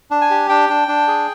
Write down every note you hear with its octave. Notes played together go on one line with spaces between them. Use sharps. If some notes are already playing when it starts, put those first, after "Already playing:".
D4
G#5
G4
D4 G5
D4
D4
G#4